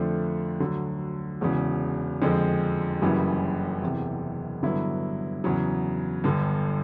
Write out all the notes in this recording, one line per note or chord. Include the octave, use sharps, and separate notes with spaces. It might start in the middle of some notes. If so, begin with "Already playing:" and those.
Already playing: F2 D3 F3 A3 D4
D2 D3 F#3
E1 E2 C#3
F2 D3 F3 G#3
F#1 F#2 C#3 E3 G3
F#1 E2 C3
G2 D3 F#3 B3 E4
E2 C#3 F#3
G1 G2 D3